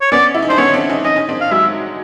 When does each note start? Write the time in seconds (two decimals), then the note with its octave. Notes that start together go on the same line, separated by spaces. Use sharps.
0.01 C#5
0.12 B3 C#4 D5
0.35 E4
0.42 D#4
0.49 D4 C5
0.58 B3 C#4 C#5
0.73 C4 D4
0.89 C#4 D#4
1.04 C#4 D#4 D#5
1.16 C#4 D#4
1.29 C4 D4
1.41 F5
1.51 F#3 G#3 E5